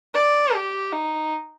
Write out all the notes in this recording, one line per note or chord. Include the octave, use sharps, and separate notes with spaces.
D5
G4
D#4